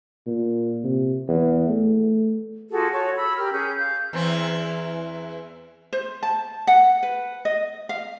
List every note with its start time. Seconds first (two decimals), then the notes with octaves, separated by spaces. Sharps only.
0.26 A#2
0.84 C3
1.28 E2
1.69 A3
2.70 F4 F#4 G#4 A4
2.91 F#4 A4 C#5 C#6
3.16 B5 E6
3.37 G4 A#4 F6
3.53 C#4 G#4 G6
3.78 F5 G6
4.13 E2 E3 C4
5.93 C5
6.23 A5
6.67 F#5
7.03 B4
7.45 D#5
7.89 F5